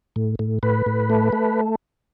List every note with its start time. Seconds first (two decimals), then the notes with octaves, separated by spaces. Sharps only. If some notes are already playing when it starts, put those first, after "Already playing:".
0.16 A2
0.39 A2
0.63 A2 B4
0.86 A2
1.10 A3
1.33 A3